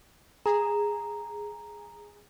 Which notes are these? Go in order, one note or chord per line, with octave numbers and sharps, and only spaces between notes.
G#4 A#5